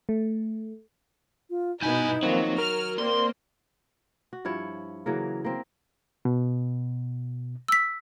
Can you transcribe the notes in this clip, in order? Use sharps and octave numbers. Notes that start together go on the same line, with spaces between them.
A3
F4
G2 B2 B3 D#4 E4 G#5 G6
D#3 F3 F#3 A#3 C4
A#4 F6
A#3 C4 D5 C6
F#4
G2 F3 E4 C#5
C#3 E3 F#3 A#3
A#3 C4
B2
E6 B6